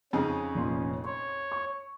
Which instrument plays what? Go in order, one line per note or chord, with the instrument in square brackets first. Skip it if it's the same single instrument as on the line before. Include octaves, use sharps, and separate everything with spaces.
[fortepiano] F2 C#3 D#4 [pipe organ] C#4
[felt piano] F1 A#2 C6
[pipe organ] C#5 [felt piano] C6
[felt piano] C#6